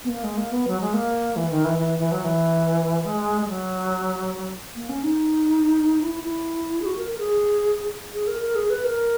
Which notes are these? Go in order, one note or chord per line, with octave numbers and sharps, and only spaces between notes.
B3
A#3
G#3
A#3
B3
F#3
G#3
A#3
E3
D#3
E3
E3
E3
F#3
E3
G#3
G#3
F#3
A#3
C#4
D#4
E4
E4
G#4
F#4
A#4
A#4
G#4
G#4
A#4
A#4
G#4
B4
A#4